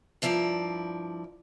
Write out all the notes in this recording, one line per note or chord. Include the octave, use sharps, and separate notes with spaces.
G2 F3 E4 D5 A#5